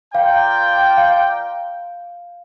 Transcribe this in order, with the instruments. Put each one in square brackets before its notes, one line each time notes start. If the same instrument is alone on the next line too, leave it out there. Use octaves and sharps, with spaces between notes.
[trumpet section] F4 A#4 D5 G5 [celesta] F5
[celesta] F5